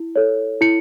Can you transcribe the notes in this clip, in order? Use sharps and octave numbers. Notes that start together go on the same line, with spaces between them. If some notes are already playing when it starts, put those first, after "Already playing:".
Already playing: E4
A4 C#5
E4 C#7